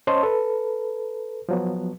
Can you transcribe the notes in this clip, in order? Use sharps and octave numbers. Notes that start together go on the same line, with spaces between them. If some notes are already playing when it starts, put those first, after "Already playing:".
C#4 C5 C#5 D#5 A5 C6
A4 B4
F3 F#3 B3